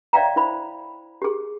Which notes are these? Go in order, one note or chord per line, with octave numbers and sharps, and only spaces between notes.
C#5 D5 E5 F5 G5 A#5
E4 C5 B5
G4 G#4